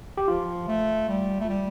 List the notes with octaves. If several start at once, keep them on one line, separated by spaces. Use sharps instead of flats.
G4
F3 F4
A3
G3
A3
G3